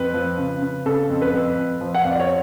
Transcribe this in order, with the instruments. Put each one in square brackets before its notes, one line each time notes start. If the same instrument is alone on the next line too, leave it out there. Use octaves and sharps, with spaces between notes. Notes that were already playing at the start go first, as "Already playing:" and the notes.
Already playing: [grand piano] F2 B4
F3
C#3
C#3
C#3 A4
F2
B4
F2
F2
F3
F#5
F2 F5
D5
C#5